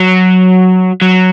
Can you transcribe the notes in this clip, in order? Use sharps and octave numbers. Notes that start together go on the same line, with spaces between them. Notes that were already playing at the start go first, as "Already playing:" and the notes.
Already playing: F#3
F#3